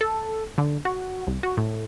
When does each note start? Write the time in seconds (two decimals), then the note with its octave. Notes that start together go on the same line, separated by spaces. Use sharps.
0.01 A4
0.58 D3
0.85 F#4
1.27 C2
1.43 F#4
1.57 A2